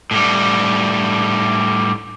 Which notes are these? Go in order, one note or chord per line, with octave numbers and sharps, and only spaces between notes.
A2 G3